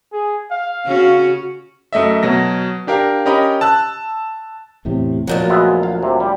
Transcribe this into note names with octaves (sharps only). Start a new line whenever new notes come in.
G#4
F5
C#3 C#4 F#4
F#2 A3 D#5 E5
B2 F#3 A#6
D4 G4 A#4 F5
C#4 G4 A#4 D#5 A#5 B5
A5 E6 F#6
E2 A2 C3
D2 A#2 F3 F#3
G#3 B3 E5
F5
C3
G3